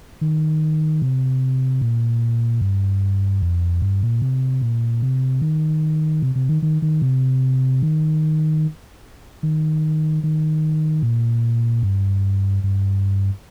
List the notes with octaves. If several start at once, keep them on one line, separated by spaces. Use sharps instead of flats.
D#3
C3
A#2
G2
F2
G2
A#2
C3
A#2
C3
D#3
C3
C3
D#3
D#3
D#3
C3
D#3
D#3
D#3
A#2
G2
G2